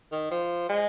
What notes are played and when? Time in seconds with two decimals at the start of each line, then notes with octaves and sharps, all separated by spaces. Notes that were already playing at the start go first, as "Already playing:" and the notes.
0.12 D#3
0.31 F3
0.69 G#3